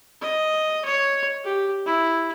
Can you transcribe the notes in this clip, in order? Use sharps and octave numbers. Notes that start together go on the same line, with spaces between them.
D#5
C#5
G4
E4